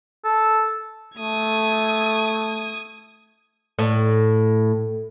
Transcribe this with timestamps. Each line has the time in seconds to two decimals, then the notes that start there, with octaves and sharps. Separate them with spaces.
0.25 A4
1.18 A3 D#6 G#6
3.79 A2